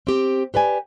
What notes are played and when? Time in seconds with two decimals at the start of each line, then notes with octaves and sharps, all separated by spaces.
0.07 C4 G4
0.54 G4 B4 D5 G#5